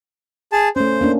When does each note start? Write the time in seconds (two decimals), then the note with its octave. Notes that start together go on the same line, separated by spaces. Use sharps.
0.52 G#4 A5
0.76 A3 C#4 C5
1.01 A#3 C#4 D4